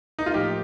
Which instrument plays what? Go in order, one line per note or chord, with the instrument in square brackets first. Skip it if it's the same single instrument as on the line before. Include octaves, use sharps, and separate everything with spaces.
[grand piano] D#4
F4
[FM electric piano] A2 F3 A#3 [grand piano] G4